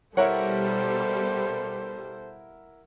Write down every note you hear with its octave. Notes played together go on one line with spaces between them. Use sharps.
B2 G3 E4 A4 A#4 C5 C#5 F#5